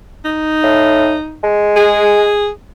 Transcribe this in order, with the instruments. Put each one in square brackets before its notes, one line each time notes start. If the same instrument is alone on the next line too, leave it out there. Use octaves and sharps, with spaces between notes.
[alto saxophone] D#4
[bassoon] A2
G#3
[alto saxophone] G#4